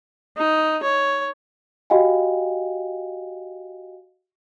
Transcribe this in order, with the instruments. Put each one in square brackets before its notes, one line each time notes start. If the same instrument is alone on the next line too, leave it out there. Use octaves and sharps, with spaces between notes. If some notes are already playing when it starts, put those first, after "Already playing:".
[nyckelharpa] D#4
C#5
[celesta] F#4 G4 D#5 F5 G5 G#5